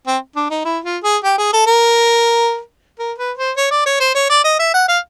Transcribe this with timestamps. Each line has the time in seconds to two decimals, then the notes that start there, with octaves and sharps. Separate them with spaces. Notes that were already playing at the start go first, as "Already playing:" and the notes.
0.07 C4
0.36 D4
0.50 D#4
0.65 E4
0.84 F4
1.03 G#4
1.24 G4
1.38 G#4
1.53 A4
1.66 A#4
2.99 A#4
3.18 B4
3.38 C5
3.57 C#5
3.71 D5
3.86 C#5
4.00 C5
4.15 C#5
4.29 D5
4.44 D#5
4.59 E5
4.74 F#5
4.88 F5